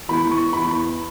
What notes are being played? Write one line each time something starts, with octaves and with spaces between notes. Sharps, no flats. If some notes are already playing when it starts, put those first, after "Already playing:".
E2 E3 B5
C#6
E2 E3 B5